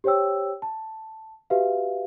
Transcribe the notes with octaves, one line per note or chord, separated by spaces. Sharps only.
G4 C5 C#5 G5 E6
A5
F#4 G4 B4 E5 F5